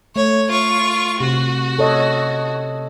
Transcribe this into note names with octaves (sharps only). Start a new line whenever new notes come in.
A3 C#5
F4 C#6
C3 F#4
A4 C#5 D#5